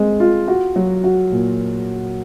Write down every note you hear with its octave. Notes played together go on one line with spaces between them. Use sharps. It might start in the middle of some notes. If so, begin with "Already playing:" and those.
Already playing: G#3 C4
F4
F#4
F#3
F#4
A#2